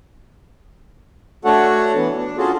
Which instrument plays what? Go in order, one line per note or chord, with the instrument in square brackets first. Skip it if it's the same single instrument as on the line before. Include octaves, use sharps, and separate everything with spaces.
[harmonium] A3 D4 F#4 A4 C#5 F#5
E3 B3
D4
C#4 F4 F#4 G#4 A4